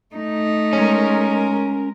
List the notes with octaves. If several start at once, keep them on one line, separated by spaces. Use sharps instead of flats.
A3 D#4
G#3 C#4 A#4